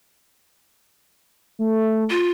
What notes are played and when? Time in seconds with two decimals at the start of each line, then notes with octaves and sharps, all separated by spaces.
1.59 A3
2.10 F4